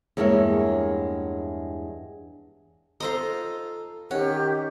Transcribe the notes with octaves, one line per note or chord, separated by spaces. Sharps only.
E2 G2 G#3 A#3 C#5 E5
D#4 F4 A4 C5 D#5
D#3 C#4 F#4 G4